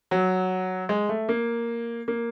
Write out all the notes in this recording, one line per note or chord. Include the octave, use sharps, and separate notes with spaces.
F#3
G#3
A3
A#3
A#3